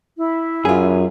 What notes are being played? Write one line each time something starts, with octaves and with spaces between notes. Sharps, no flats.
E4
F#2 F4 G#4